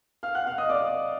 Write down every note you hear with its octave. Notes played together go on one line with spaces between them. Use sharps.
F5 F6
F#5 F#6
F5 F6
D#5 D#6
D5 D6